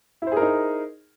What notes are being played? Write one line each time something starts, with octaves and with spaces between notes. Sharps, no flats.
D#4 E4 G#4 A#4 C5